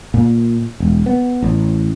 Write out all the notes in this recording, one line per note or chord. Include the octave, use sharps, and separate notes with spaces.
A#2
E1
B3
A1